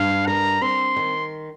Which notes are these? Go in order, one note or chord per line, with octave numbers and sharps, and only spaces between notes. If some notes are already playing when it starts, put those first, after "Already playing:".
Already playing: G2 F5
A#4 A#5
C4 C6
D#3